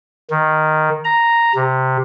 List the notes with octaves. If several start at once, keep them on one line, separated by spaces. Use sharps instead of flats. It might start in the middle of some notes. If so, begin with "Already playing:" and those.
D#3
A#5
C3